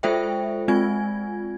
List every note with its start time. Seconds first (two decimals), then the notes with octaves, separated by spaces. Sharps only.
0.03 G#3 F4 A4 C5 E5 G5
0.68 G#3 C4 F4 G#5 G#6